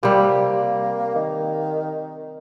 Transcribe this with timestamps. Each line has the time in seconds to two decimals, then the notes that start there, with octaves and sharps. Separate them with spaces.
0.03 C3 G3 A#3
1.15 D#3